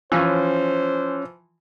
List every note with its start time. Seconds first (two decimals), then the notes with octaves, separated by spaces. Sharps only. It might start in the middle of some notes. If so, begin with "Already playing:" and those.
0.12 E3 F3 C#4 C5